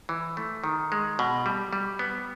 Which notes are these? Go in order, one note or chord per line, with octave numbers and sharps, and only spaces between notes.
E3
A3
D#3
G#3
B2
G3
G3
B3